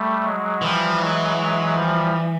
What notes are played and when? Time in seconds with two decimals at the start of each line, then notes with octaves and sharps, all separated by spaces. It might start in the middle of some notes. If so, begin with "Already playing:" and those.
Already playing: G3 A3
0.24 F#3 G#3
0.62 E3 F3 G3
0.99 F#3 G#3
1.36 F#3 G#3
1.74 F3 G3